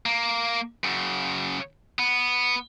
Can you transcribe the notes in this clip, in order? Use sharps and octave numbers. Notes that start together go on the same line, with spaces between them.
A#3
F#2 C#3
B3